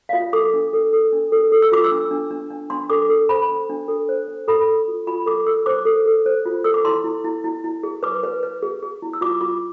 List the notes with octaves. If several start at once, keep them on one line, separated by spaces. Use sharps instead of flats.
F5
F4 E5
A4 D6
D4
A4
A4
D4
A4
A4
E6
F4 D6
E6
D4
D4
D4
D4
D4 C6
A4 D6
A4
C5 B5
D4
D4
A4
C5
D4
A4 B5
A4
F4
F4 B5
A4 D6
A4 E6
C5 D6
A4
A4
C5
F4
A4 E6
D6
E4 C6
E4
E4
E4
E4
G#4
B4 D6
B4
B4
G#4
G#4
E4
E6
F4 D6
F4 D6